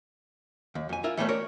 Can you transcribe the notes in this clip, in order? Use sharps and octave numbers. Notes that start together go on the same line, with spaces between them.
D#2
F2 G#5
E4 F4 A#4
E3 G3 A3 B3 C#4
A#4 C#5 D5